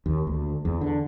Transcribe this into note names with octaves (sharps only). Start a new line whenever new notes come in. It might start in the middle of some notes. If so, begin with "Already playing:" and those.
D#2
D2
E2
D3